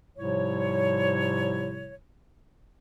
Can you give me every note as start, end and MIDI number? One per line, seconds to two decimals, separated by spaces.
0.17 1.94 44
0.17 1.94 48
0.17 1.94 53
0.17 1.94 55
0.17 1.94 64
0.17 1.94 73